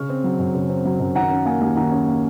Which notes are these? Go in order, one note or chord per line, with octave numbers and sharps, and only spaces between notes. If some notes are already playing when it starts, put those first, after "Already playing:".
Already playing: C#3 C#6 F6
C4
F#3
F#2
C#3
C4
F#3
F#2
D#3 F#5 A#5
C#4
A#3 F5 G#5
D#2
D#3 F#5 A#5
C#4
A#3